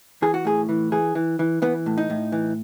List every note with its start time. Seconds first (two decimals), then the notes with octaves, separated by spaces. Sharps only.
0.22 E3 G#4
0.34 F#4
0.45 A2 G#4
0.69 E3
0.92 E3 G#4
1.15 E3
1.39 E3
1.62 E3 B3
1.86 A2
1.98 D#4
2.10 A2
2.32 E3